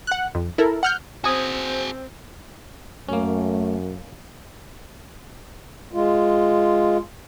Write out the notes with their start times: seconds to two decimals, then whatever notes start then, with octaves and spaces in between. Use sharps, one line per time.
0.07 F#5 F#6
0.35 F2
0.58 E4 A4 A#4
0.83 F#5 F6 G6
1.24 C4 F#4 G#4 C5 G#5 D#6
3.09 F#2 A3 A#3 C#4
5.93 G#3 F4